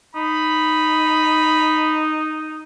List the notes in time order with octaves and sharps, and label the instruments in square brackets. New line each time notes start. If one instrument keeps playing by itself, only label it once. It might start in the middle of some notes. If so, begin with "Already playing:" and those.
[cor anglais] D#4 [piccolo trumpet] B5